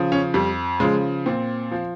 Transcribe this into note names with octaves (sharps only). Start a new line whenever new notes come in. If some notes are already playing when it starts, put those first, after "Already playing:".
Already playing: C#3 F3
C#4
F2 G3
C#3 F3 G#3
A#2 C4
F3